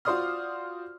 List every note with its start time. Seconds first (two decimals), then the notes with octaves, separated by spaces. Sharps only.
0.05 F4 F#4 C5 D5 D#6 F6